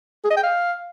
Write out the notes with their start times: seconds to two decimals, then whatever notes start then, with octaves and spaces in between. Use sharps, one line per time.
0.24 G#4
0.31 D#5
0.37 G5
0.43 F5